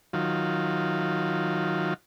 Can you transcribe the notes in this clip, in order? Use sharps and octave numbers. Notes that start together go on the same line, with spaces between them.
D#3 F#3 F4